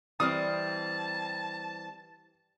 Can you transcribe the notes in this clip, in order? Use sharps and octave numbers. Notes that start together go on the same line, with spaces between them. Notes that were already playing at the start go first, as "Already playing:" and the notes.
E3 G3 C4 A5 D#6 F6